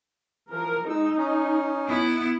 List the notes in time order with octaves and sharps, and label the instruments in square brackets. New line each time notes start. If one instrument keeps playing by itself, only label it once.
[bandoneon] E3 F3 [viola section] A#4
[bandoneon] G#3 E6 [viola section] D#4
[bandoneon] C#4
[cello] B3 E4